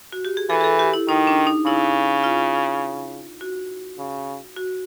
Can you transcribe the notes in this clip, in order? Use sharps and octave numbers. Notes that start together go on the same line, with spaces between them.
F#4
G4
G#4
E3 A4
G#4
A4
G4
E4
D#3 D#4
D4
D#4
C#3 E4
F4
F#4
C#3
F#4